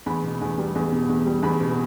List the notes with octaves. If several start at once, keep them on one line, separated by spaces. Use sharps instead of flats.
E2 B5
B2
E2
G3
E2
B2
E2
G3
E2 B5
B2